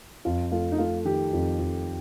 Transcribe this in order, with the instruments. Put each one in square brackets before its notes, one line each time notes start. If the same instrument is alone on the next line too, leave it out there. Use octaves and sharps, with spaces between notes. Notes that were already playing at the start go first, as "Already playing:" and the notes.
[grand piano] F2 [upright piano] F4
[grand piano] A3 [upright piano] F4
[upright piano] D#4
[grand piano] A3 [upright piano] F4
[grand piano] D#3 [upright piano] G4
[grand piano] F2
F2